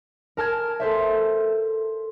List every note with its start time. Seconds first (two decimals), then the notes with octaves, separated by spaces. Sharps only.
0.37 A#4 A5 F6 G#6
0.80 A4 C5 E5